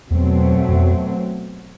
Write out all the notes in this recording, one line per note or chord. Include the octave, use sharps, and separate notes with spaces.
E2 B2 F#3 A3 C4
F#2
F2